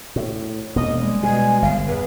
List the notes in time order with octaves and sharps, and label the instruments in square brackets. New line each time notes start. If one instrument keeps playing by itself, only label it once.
[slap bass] A2
[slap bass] E1 A#3 [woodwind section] D#5
[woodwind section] G3 G#3
[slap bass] B2 [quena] G#5
[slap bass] G1 [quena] F5
[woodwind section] E2 [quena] B4